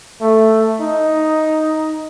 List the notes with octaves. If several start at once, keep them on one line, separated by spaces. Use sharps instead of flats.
A3
D#4